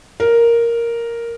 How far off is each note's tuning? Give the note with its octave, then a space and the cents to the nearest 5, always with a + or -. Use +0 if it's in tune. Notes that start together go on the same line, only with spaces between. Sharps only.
A#4 +0